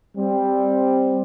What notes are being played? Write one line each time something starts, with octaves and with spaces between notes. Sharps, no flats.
G3 C4